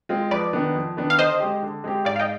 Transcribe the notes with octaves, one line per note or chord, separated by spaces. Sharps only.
G#3 C4 F4
F2 B4 D5
D#3 B3 D4
F2
D#3 B3 D4
F5
D3 C5 D#5
G#3 C4 G4
D3
G#3 C4 G4
G#2 D5 F5
F5
D#5 G5